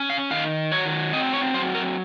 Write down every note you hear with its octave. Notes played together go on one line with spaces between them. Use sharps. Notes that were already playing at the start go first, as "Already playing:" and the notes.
Already playing: C#4
F5
D#3 F5
F#3 C#5
C4 D#5
C#5
F#3 C5
A#4